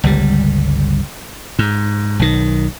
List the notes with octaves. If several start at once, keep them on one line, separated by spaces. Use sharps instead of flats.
G1 C#2 G3
G#2
B1 D#3